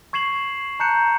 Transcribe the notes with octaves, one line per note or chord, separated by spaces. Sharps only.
C#6 G#6 C7 E7 F#7
A5 A#5 F#6 G6 C#7 E7